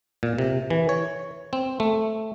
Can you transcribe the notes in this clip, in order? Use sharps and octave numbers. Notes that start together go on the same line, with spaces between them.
A#2
C3
E3
C#5
C4
A3